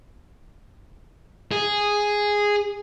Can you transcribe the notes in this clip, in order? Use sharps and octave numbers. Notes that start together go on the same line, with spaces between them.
G#4